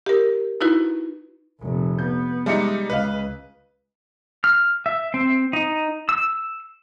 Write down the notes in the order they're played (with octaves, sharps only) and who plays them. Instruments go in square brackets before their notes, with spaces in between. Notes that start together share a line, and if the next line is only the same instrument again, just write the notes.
[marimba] G4 A#4
D#4 E4 F#4 B4
[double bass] F1 A#1
[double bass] B3 [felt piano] G6
[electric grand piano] G3 D#4 [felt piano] G#3 E5 C#7
[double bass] C#2 [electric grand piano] B4 [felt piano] D#5 F5
[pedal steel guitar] F6
E5
C4
D#4
E6